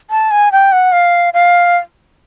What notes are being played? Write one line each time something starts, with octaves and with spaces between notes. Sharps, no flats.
A5
G#5
G5
F#5
F5
F5